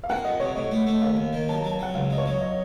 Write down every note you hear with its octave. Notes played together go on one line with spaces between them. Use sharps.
F5
A#3 F#5
F2 D#5
C3 C#5
A2 D#5
A3
A3
D#2 F5
D#2
D#3
F#3 A5
F#3 A#5
A5
F#3 F#5
C#2 F5
F#3 D#5
C#5
F#3
D#5